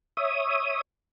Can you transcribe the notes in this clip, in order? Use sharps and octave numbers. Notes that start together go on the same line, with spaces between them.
C#5 E5 D#6